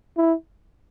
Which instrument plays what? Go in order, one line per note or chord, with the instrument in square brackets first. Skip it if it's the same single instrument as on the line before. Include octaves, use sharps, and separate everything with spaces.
[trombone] E4